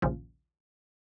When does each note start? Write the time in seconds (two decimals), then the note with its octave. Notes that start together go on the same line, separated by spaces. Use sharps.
0.02 A#1 D#2 C#3 F3